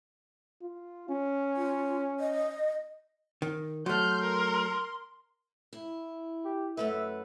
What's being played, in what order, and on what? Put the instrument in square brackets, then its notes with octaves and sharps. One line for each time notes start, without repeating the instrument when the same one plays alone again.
[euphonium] F4
C#4
[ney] F4
D#5
[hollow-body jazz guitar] D#3
[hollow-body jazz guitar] F#3 A3 [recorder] C6 [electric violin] F6 G6
[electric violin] A#4
[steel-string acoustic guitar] E4
[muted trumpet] G4
[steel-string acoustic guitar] F#2 A3 B4 [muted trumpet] E5